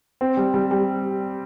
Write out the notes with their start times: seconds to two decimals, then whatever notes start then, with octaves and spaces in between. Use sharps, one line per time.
0.21 C4
0.37 G3
0.54 G3
0.71 G3